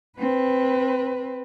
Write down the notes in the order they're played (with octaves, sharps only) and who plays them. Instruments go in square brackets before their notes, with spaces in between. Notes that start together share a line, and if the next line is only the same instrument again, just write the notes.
[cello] C4 B4